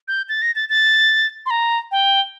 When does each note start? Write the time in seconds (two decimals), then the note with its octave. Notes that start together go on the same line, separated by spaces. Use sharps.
0.08 G6
0.29 A6
0.42 A#6
0.56 A6
0.69 A6
1.46 C6
1.50 A#5
1.91 G5